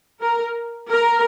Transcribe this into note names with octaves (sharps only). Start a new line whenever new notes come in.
A#4
A#4